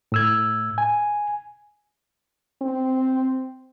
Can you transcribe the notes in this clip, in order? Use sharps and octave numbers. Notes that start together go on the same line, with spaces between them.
A2 E6 G#6
G#5
C4